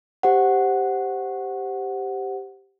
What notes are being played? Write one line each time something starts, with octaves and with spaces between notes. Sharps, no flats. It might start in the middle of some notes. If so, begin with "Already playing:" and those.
G4 C5 F#5